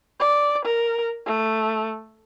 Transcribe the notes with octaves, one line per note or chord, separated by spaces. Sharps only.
D5
A#4
A3